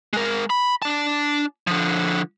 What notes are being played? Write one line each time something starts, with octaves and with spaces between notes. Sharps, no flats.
G#3 A#4
B5
D4 A5
D3 F3